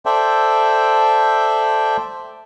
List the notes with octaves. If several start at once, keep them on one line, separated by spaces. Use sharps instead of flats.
A4 C5 D5 E5 G5